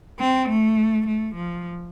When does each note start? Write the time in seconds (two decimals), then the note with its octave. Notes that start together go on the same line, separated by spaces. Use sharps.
0.20 C4
0.49 A3
1.07 A3
1.35 F3